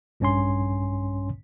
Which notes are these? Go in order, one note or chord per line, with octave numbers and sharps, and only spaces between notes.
A#1 G2 C#4 C#5 G#5 C6